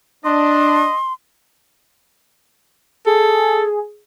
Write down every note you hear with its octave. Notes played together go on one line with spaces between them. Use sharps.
D4 D#5 C6
G#4 A4